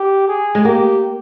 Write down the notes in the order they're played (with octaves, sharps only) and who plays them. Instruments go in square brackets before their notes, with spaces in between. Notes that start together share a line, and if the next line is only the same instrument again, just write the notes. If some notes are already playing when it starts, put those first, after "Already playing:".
Already playing: [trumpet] G4
G#4
[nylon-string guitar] G#3
[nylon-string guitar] A#3 [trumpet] G4